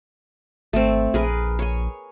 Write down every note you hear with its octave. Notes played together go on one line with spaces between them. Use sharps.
G#1 A3 C4
A#1 G#4 A#4 B4
C#5 G#5